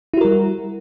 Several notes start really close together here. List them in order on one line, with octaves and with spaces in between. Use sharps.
E4 F#4 A#4 G3